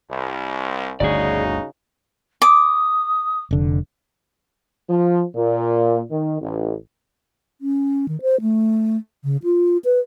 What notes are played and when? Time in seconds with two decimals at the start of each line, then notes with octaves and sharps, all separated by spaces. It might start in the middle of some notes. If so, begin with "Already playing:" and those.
0.10 C2
1.00 G1 D2 C#3 D#4 F#4 G#4 D5
2.42 D6 D#6
3.51 F1 D3
4.89 F3
5.36 A#2
6.11 D#3
6.41 A1
7.61 C#4
8.08 D#3
8.22 C5
8.41 A3
9.24 C#3
9.44 F4
9.84 B4